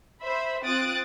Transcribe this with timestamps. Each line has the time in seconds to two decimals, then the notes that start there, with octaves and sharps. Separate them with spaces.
0.21 C5 E5 B5
0.64 C4 F4 D#6 F#6 A6 D7